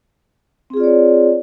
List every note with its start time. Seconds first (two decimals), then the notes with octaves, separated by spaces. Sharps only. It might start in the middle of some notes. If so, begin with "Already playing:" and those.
0.70 C4
0.74 G#4
0.77 F4
0.80 D5
0.83 C#5